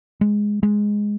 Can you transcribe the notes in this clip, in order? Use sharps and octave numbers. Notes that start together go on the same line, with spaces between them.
G#3
G#3